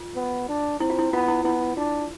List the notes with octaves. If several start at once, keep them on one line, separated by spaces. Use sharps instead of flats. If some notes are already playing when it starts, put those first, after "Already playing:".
Already playing: F4
B3
D4
C4 E4
F4
E4
B3 F4
E4
B3 E4
E4
D4 F4